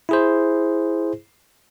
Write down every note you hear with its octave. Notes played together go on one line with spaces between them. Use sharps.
E4 G#4 C5